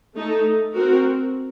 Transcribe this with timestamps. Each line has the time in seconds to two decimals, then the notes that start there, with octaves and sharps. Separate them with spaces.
0.15 A3 D#4 A4
0.75 C4 F#4 A#4